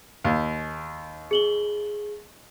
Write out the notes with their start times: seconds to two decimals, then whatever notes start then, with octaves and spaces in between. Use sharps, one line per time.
0.24 D#2
1.31 G#4 F#7 G7